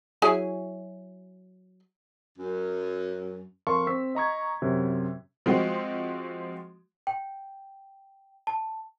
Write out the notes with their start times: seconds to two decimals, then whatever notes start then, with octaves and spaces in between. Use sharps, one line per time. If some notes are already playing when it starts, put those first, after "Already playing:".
0.22 F#3 E4 G#4
2.37 F#2
3.67 F2 A#4 F5 A5 C6 C#6
3.87 C4 E6 B6
4.15 D#5 A#5 C#6 G#6
4.62 F#2 C3
5.46 F3 G#3 C4 F#4
7.07 G5
8.47 A5